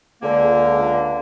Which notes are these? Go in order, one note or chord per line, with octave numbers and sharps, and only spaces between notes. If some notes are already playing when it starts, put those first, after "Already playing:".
C#2 D3 A#3